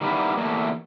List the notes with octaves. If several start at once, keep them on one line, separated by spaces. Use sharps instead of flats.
D#3 G3 A#3 B3 E4
E2 D#3 A3 A#3